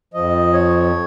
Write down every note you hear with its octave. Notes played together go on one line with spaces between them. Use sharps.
F2 F3 D#5
C#5